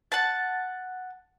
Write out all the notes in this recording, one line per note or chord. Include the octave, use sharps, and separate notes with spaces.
F#5 A5